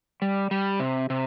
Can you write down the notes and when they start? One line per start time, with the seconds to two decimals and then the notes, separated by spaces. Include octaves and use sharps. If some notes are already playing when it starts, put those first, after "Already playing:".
0.22 G3
0.51 G3
0.80 C3
1.10 C3